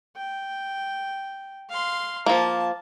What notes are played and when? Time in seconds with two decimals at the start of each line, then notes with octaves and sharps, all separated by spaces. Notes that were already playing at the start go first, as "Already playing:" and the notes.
0.16 G5
1.70 F5 C6
2.26 F3 A#3 A5